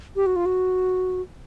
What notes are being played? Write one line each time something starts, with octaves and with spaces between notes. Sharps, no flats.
G4
F#4
F4
F#4